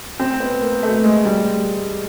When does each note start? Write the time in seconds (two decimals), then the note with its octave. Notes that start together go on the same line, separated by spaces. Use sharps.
0.19 C4
0.40 B3
0.62 A#3
0.83 A3
1.04 G#3
1.25 G3